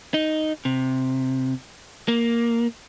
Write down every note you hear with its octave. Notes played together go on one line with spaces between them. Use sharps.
D#4
C3
A#3